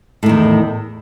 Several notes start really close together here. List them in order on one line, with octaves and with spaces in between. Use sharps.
A2 D#3 E2